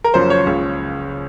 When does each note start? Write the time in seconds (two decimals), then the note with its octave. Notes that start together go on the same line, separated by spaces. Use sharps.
0.04 A#4
0.14 F#1 F#2 F3 C5
0.30 C#5
0.46 C#2 C#3 F3